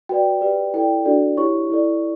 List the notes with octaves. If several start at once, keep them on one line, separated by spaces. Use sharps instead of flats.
F#4 B4 D5 G5
G4 B4 D5
E4 A4 D5 G5
D4 F#4 A4 D5
E4 G4 C#5 C#6
E4 A4 D5